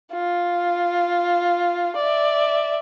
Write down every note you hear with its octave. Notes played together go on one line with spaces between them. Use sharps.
F4
D5 E5